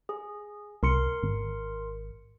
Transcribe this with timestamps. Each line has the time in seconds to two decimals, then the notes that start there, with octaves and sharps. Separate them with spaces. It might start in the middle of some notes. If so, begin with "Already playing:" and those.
0.09 G#4
0.83 C2 A#4 C6 C#7
1.23 G#1